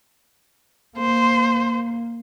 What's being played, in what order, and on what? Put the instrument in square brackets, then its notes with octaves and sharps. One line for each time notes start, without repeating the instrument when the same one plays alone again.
[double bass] A#3 [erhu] C5